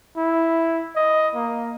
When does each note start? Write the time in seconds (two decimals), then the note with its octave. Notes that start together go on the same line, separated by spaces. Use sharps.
0.17 E4
0.96 D#5
1.35 A#3